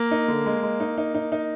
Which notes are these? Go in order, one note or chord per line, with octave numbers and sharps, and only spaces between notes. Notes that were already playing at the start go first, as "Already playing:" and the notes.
Already playing: A#3
D#4
D3
G#3
G#3
D#4
D#4
D#4
D#4